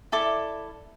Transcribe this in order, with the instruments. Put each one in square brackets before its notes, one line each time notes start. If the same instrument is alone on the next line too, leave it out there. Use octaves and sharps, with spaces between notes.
[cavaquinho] E4 A4 D5 D6